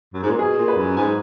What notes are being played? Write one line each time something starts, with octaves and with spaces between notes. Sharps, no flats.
F#2
G#2
A#2
B2 G#4
A#2
B4
F#2
G#2 G#5